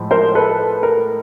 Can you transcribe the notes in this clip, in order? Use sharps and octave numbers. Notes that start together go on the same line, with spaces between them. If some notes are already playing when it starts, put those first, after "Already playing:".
Already playing: A2 F3 G#3
A#4 C5
A4 B4
A#4